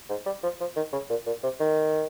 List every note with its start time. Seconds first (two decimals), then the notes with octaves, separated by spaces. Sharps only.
0.10 G#2
0.26 G3
0.43 F3
0.61 F3
0.77 D#3
0.93 C#3
1.10 A#2
1.26 A#2
1.43 C3
1.60 D#3